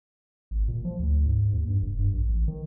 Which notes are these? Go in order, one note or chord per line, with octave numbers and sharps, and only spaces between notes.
G#1
A#2
F3
D2
G#2
D#2
G2
F1
G2
A#1
A1
D#3